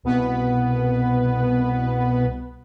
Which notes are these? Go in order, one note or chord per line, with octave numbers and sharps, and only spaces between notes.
C2 B2 B3 B4